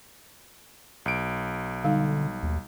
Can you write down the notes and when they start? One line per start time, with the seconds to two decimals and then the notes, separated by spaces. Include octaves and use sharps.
1.06 B1 D7
1.84 D3 G3 D#4 F5
2.43 D#2